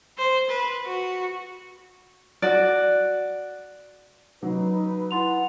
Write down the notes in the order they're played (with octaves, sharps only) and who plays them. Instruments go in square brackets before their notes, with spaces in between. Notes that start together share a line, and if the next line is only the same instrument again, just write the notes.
[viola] C5
B4
F#4
[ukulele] F#4 D5
[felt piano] F#3 [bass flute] D#4 [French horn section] B4
[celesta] E4 C6 F7 [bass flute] F#5